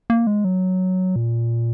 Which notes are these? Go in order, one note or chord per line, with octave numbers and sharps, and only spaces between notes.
A#3
G#3
F#3
A#2